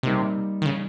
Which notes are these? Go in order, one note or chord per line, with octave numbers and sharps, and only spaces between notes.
C3 G3 A#3 D#4
D#3
C#3